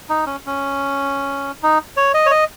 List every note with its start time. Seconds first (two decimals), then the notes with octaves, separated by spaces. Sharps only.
0.09 D#4
0.26 C#4
0.46 C#4
1.63 D#4
1.97 C#5
2.14 D#5
2.26 C#5
2.31 D#5